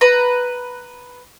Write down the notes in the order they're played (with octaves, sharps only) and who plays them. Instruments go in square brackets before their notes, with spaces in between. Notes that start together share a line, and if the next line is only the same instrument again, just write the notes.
[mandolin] B4 A#5